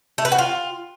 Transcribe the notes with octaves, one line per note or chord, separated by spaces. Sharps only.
A3
B4
F#4
F4